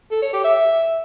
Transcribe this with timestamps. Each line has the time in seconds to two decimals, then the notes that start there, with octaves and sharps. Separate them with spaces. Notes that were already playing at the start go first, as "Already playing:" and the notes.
0.11 A4
0.22 C#5
0.33 G4
0.44 E5